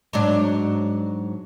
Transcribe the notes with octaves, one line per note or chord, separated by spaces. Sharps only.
G#2 F#3 D4